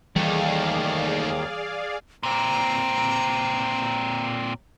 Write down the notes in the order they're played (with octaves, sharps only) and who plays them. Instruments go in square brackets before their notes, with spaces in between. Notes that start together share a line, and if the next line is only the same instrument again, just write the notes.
[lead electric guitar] D#2 [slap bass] E3 G3 [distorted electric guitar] A3 D#4 [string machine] G#4 D5 F5
[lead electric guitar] A#2 C4 [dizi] A#5